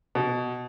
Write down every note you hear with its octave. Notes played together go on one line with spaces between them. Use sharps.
B2